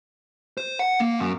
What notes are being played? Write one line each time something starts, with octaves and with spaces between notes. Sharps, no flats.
C5
F#5
A#3
F#2